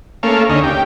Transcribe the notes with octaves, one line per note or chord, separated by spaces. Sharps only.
A3 A#3 C#4 F5
D2 C#4 D#4
G4